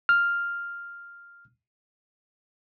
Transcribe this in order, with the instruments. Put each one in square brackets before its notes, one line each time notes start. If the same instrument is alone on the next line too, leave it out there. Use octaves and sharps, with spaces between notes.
[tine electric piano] F6